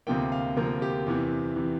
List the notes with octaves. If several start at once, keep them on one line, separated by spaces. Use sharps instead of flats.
D2 C3 F3 A#3 G5
F5
D2 C3 F3 A#3 A#4
G4
E2 C3 E3
C3 E3